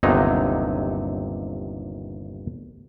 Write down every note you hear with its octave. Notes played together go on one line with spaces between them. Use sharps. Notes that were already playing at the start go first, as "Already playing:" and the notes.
G1 D#2 C3 F#3 D#4